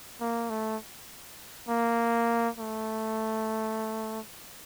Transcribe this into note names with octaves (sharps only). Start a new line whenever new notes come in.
A#3
A3
A#3
A3